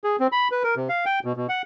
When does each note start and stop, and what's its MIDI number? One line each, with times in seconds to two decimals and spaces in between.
0.04 0.16 68
0.20 0.27 60
0.32 0.48 83
0.51 0.63 71
0.63 0.75 70
0.76 0.88 48
0.89 1.05 77
1.06 1.20 79
1.24 1.33 47
1.36 1.47 47
1.49 1.62 78